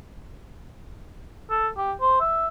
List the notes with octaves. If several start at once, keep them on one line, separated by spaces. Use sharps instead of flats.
A4
G4
C5
E5